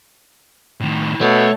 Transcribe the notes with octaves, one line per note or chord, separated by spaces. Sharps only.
A2 D#3
B2 A3 C#5